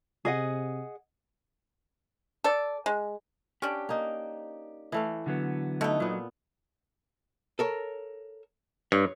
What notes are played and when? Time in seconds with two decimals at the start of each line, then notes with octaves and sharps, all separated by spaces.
0.25 C3 G#4 D#5 F#5
2.44 A4 D5
2.86 G#3
3.62 C#4 D4 G4
3.89 A#3 D#4
4.92 E3 A3 F5
5.26 D3 F#3 B3
5.81 B2 A3 D#4
6.00 A#2 F#3 B3
7.59 A4 A#4 C#5
8.92 G2 C#5